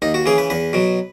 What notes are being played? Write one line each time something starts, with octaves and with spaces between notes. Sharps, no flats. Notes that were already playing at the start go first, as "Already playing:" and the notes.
D#2 D#4
F#4
C#3 E3 G#4
B4
E2 B4
B2 F#3